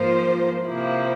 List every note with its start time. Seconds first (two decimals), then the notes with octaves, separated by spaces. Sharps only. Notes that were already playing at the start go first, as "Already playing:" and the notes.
Already playing: G#2 F3 A#3 F4 C5
0.65 C3 F3 A#3 E4